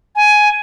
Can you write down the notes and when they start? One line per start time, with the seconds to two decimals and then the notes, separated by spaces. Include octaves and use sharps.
0.16 G#5